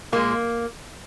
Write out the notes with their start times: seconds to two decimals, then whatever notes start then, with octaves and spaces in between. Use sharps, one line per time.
0.12 A#2 G#3 A#3